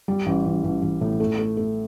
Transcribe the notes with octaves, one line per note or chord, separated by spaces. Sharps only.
G3
A1
A1
A1
A1
A2
A3
A3
A3